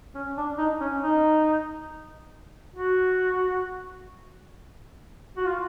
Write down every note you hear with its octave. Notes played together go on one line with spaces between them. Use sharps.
C#4
D4
D#4
C#4
D#4
F#4
F#4
F4